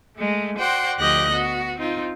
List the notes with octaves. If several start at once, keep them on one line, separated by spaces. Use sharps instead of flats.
G#3 A3
F#4 C5 D5 F#5 G5 C6
D2 F3 G4 D#5 F#6 A#6
B3 F#4
C4 D#4 F4